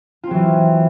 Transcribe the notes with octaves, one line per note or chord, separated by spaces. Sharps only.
E3 F#3 C4 F4